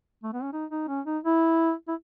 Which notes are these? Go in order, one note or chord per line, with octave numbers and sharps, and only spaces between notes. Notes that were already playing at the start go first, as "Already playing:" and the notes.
A3
B3
C#4
D#4
D#4
C#4
D#4
E4
E4